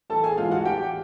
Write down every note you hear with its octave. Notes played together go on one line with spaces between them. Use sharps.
A1 A4 A5
G#4 G#5
G#2 E3 F4 F5
F#4 F#5
A1 G4 G5